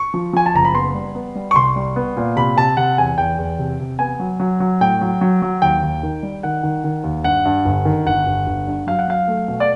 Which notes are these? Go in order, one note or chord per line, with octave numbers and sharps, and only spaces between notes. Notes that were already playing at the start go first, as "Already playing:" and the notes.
Already playing: C#6
F3
F3 G#5
A5
F#1 A#5
B5
B3 C6
G3
B3
G3
C#6
C2 C6
G3
B3
A#2
C3 B5
C3 A5
C3 F#5
E2 G#5
E2 G5
E2
C3
C3
B3 G#5
F#3
F#3
F#3
A2 G5
F#3
F#3
F#3
D#2 G5
D#2
D#3
G3
D#3 F#5
D#3
D#3
D#2
G2 F#5
G2
G1
D#3
G1 F#5
G1
G1
G2
F#3 F5
F#5
F#3 F5
A3
B2
D5